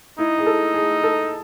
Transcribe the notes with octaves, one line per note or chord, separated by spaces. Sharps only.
D#4 E4
G#4
A4
G#4
A4